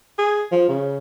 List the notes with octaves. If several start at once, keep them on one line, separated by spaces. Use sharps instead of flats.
G#4
F3
C#3